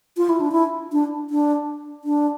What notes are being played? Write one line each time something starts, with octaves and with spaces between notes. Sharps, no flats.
F4
E4
D4
E4
D4
D4
D4